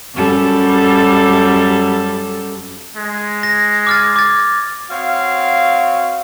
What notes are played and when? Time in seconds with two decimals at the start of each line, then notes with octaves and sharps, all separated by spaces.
0.15 F#2 G3 A4
2.96 G#3
3.43 A#6
3.87 D6 F6 A6
4.16 D6 G#6 A6
4.90 C4 F#4 C#5 F5